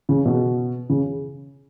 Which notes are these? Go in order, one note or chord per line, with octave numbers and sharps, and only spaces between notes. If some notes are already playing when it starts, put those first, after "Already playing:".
C#3
B2
C#3